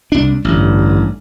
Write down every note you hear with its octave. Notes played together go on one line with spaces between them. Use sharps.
C2 D4
A1 G2 D3